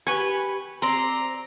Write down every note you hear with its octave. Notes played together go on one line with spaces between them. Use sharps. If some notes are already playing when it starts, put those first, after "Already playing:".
G4 B4 G#5 C#6
C4 D5 A#5 C6